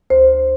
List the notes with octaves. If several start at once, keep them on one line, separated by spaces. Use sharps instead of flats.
D2 C5